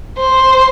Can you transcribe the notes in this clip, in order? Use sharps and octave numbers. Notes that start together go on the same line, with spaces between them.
C5